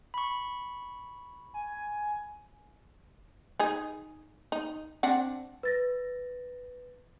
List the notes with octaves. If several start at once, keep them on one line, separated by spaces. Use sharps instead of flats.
B5 C#6
G#5
D#4 G#4
D#4
C4 D4 F#5
B4 A6 A#6